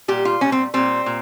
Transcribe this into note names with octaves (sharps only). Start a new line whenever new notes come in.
A#2 G3 G4
F4
A#2 G3 C#4
C4
A#2 G3 C4
A#2